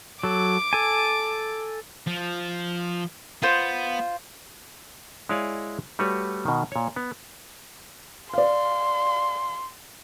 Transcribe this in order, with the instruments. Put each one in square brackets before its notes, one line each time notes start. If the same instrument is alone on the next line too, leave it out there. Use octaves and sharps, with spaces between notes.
[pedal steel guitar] F#3 A4 [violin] D6
[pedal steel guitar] A4 G#5
[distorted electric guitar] F3
[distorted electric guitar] B3 [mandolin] F4 C5
[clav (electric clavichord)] G#3 E4 C#5 D5 F5 G#5
G3 A3 F#4 B4 C#5
B2 D#3
A#2 C#5
B3
[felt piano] D5 F5 [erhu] C6